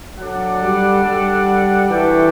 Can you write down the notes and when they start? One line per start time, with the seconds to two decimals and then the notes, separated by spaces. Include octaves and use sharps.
0.18 F#3 D4 A4 D5 F#5
0.62 G3
1.05 G3
1.90 E3 D4 F#4 A4 E5 G5